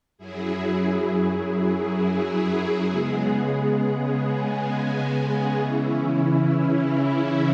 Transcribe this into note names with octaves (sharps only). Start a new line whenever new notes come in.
F#2 F#3 E4 G#4
C#3 G#3 B3 G#4
C#3 E3 C#4 E4